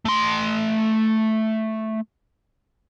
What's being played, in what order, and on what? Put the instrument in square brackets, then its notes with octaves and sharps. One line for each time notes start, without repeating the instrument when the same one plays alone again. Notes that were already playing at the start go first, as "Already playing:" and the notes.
[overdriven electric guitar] A3 C6